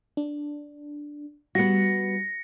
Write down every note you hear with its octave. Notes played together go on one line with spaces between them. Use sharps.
D4
G3 B3 F#4 F#5 A#6 C#7